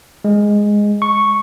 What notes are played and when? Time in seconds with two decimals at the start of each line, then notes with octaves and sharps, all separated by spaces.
0.24 G#3
1.02 C#6